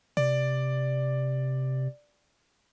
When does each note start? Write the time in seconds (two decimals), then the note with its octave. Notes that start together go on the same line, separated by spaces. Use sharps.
0.17 C3 D5